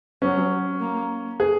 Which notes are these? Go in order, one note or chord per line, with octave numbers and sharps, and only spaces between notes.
F#3 C#4
A#3
G#4